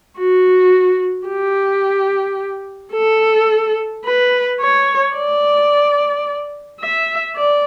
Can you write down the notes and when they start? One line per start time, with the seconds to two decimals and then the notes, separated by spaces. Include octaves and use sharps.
0.18 F#4
1.28 G4
2.94 A4
4.05 B4
4.60 C#5
5.15 D5
6.81 E5
7.37 D5